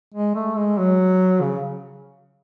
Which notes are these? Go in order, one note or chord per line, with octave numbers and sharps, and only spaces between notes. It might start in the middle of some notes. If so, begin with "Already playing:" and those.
G#3
A3
G#3
F#3
C#3